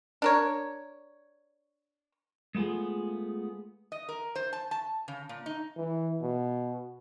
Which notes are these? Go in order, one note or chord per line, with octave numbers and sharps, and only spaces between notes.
D4 A#4 C#5
G#3 A3 B3 F4 G#4
D#5
A#4
C5
A5
A5
C#3
A#2
D#4
E3
B2